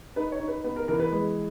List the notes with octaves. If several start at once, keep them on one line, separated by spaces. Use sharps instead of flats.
D#4 B4
C#5
D#4
B4
B3 B4
A#4
E3 A#4
B4
G#3